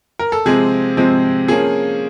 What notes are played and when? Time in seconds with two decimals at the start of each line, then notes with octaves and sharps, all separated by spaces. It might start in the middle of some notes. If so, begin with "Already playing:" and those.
0.19 A#4
0.32 A4
0.46 C3 F3 G#3 C4 G#4
0.97 C3 F3 G#3 C4
1.48 F3 A#3 C#4 G#4